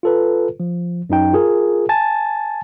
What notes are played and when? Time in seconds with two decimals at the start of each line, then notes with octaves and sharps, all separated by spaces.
0.03 F4 A4 B4
0.60 F3
1.10 F#2 F#3 D#4 G5
1.33 F4 G#4 A#4
1.89 G#5 A5 A6